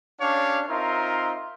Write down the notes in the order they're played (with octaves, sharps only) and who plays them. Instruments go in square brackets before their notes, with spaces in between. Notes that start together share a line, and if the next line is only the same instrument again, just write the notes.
[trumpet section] C#4 D4 G4 C#5 D5 F5
C4 D#4 F4 A#4 E5 C6